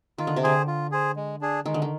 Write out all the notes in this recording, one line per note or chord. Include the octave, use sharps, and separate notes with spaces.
D#3 F4
D3
C3
D3 G#4 C5
F4
G#4 C5
G#3
D4 G#4
D#3 G#3
D3
D#3